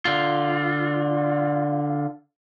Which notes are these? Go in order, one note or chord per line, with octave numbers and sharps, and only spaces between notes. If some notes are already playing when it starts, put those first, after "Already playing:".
D3 F4